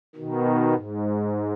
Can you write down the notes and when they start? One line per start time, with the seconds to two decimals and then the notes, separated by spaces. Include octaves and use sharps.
0.16 B2 D#3
0.72 G#2